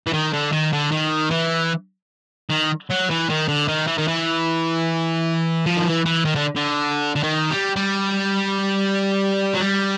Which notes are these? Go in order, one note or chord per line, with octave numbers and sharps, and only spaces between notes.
E3
D#3
D3
D#3
D3
D#3
E3
D#3
F#3
E3
D#3
D3
D#3
E3
D#3
E3
F3
D#3
E3
E3
D#3
D3
D3
D3
D#3
G3
G3
F#3
G3